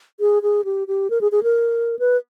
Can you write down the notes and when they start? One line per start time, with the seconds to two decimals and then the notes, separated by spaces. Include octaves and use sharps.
0.20 G#4
0.43 G#4
0.65 G4
0.88 G4
1.10 A#4
1.21 G#4
1.32 G#4
1.43 A#4
1.99 B4